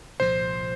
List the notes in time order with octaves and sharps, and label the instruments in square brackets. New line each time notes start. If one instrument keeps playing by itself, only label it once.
[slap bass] C2 A#2 F3 [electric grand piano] C5